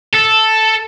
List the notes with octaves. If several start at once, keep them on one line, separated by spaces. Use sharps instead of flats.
A4